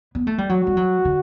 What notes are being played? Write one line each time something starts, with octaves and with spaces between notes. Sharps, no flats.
B3
A3
G3
F#3 F#4
G3
F#3
D3